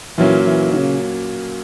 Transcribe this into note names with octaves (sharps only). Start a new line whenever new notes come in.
A#2 E3 F#3 A#3 C#4
E3
D#3
C#3